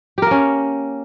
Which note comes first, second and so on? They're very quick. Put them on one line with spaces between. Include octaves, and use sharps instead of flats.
G4 A#4 A#3 C#4